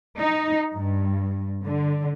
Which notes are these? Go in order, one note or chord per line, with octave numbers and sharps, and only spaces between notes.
D#4
G2
D3